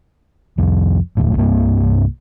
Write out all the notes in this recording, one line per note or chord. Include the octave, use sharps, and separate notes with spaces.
C2 F2
E1 D2 A2
C2 G2 A#3